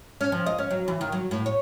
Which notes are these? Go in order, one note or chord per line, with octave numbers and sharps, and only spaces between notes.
C#4
F3
D#5
C#4
F#3
E3
D#3
F#3
A2
C#5